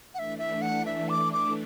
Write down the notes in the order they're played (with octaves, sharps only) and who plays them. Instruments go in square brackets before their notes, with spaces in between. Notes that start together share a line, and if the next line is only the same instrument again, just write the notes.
[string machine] E3 A3 D4 [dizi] E5 F#5
[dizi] E5
F#5
E5
D6
D6